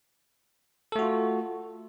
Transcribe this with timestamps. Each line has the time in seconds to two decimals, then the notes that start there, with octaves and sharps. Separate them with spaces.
0.92 A4
0.96 A3
0.99 F#4
1.02 F4